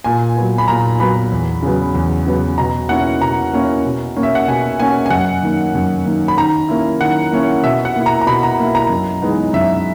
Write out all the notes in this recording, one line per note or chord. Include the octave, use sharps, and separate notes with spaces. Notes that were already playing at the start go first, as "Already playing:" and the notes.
A#2 G#5
F#3 B3
B5
A#2 A#5
F#3 B3 B5
E2
C#3 F#3 B3
E2
C#3 F#3 B3
B2 A#5
A#3 C#4 E4 F#5
B2 A#5
A#3 C#4 E4
B2
A#3 C#4
E5
F#5
B2 G#5
A#3 C#4 G#5
G#5
F#2 F#5
D#3 A#3
F#2
D#3 A#3
B5
D#3 A#5
A#3 C#4 E4
D#3 F#5
A#3 C#4 E4
B2 E5
F#5
A#3 E4
A#5
A#5
B2 B5
A#5
A#3 E4
A#5
F#2
E3 G#3 B3 D#4
F#2 E5